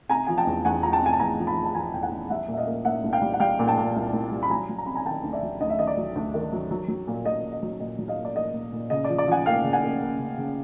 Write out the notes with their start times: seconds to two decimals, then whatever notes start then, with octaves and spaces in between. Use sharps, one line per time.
0.09 C3 G#5 A#5
0.27 F3 G#5
0.38 G5 A5
0.47 E2
0.65 E2 F#5 G#5
0.83 F3 A#5
0.92 G5 A5
1.02 C3 G#5
1.13 A5
1.20 E2 G#5 A#5
1.39 F3
1.47 A5 B5
1.57 F3
1.65 A5
1.75 F3 G#5 A#5
1.93 E2 G5
2.03 F#5 G#5
2.11 E2
2.30 G3 E5 F#5
2.48 A#2
2.54 E5
2.58 D#5 F5
2.66 A#3
2.85 A#2 E5 F#5
3.04 C2
3.13 F5 G5
3.21 G3
3.33 F#5
3.40 G3 F5 G5
3.59 A#2
3.67 G5 A5
3.78 A#2
3.96 C2
4.14 C2
4.32 G3
4.43 B5
4.50 F#3 G#5 A#5
4.69 F#3
4.78 A#5
4.86 C3 B5
4.95 G#5 A#5
5.05 D#3 G5 A5
5.23 D2
5.33 D5 E5
5.43 F#3
5.61 D2 D#5
5.70 E5
5.78 D#3 D#5
5.87 D5
5.97 F#3
6.16 D2
6.34 D#3
6.52 F#3
6.71 F#3
6.88 F#3
7.07 A#2
7.26 A#2 D#5
7.43 A#2
7.53 D#5
7.63 F#3
7.80 A#2 D#5
7.99 F#3
8.08 D#5 F5
8.18 A#3
8.25 D5
8.35 A#3 D#5
8.54 A#2
8.72 A#2
8.90 C#3 D#5
9.04 F3 D5
9.18 D5
9.28 F3 F#5 G#5
9.46 A#3 F5 G5
9.64 C#3
9.73 F#5 G#5
9.83 A#3
10.01 A#3
10.19 C#3
10.38 C#3